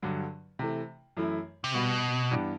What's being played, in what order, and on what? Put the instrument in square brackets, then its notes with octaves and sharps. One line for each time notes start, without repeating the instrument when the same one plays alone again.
[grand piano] G2 D3 F#3
C3 E3 A3
F#2 E3 A3 E4
[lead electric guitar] C3
[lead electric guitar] B2 [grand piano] G3 B3 F#4
[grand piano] G2 E3 B3 D4 G4